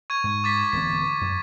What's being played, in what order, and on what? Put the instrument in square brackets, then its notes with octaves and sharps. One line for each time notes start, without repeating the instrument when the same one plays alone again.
[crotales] C#6 G#6 D#7
[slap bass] G#2
[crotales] D6 A6 B6
[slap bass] D1 E3 B3 [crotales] B6
[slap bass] F#2